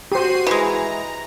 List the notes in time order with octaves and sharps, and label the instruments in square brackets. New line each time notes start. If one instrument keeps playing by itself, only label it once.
[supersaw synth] F#4 C7 D#7 [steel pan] G4 C5
[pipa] E3 G#3 [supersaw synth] A#5